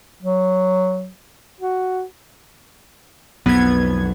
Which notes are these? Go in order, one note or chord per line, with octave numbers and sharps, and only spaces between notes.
F#3
F#4
B1 F2 B3 G#6